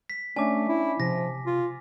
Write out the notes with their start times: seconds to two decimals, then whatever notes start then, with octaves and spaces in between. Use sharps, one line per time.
0.10 B6
0.36 A3 C#4 D4 G#5 D6
0.69 E4
1.00 C3 F3 A#6
1.46 F4